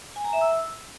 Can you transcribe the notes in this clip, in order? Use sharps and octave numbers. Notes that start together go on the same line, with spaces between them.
G#5
A#5
E5
E6